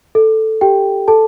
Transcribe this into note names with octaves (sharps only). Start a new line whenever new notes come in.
A4
G4 G5
A4 A5